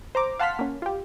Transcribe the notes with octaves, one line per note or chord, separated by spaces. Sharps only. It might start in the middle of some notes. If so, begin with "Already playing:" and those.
C5 A#5 D6
F5 F#5 A5 C6 F6 B6
A#3 C#4
F4 G4